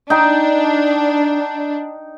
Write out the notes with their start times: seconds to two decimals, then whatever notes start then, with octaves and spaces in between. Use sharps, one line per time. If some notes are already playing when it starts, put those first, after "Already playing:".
0.10 D4 D#4 G5